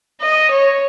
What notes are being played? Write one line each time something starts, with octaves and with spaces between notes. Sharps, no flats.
D#5
C#5